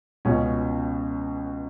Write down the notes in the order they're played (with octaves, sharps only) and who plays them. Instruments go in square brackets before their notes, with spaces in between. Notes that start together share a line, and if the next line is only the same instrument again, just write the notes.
[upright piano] C#2 B2 C#4